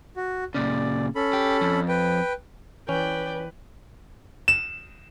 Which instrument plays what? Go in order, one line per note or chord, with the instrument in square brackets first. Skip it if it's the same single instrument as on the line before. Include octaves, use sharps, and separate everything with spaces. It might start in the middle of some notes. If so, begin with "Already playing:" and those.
[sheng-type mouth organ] F#4
[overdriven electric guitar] A#2 C#3 [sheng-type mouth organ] D5
[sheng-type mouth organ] C#4 A4 B5
[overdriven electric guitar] G4
F2
[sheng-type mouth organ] B4 G5
[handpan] E3 [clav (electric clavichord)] C#4 [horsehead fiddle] B4 [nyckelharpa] D5 G5
[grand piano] E7